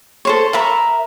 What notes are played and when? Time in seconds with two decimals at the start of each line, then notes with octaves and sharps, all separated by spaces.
0.25 A4 C5 C#5
0.53 A#4 E5 A#5 B5